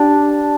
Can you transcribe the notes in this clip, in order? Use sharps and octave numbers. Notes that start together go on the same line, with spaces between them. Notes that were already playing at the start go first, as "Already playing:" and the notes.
Already playing: D4 G4